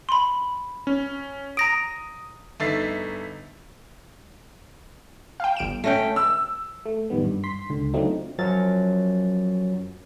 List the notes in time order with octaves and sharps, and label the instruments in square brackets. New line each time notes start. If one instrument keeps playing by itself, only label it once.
[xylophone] B5 C6
[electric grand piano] C#4
[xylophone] A#5 A#6 D7 [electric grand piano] D#6
[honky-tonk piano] G1 A3 D#4 E5 A6 C7
[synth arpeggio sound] F5 G5
G1 D7 E7
[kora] A3 C#4 G5 [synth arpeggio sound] A#6
[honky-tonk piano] E6
[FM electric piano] A3
A1 F2 D#3 G3 B3
G2
C6 B6
C#2 D3
F#3 A3 C4 D4 D#4 F4
[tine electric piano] F#2 F3 F#3 C#4 A6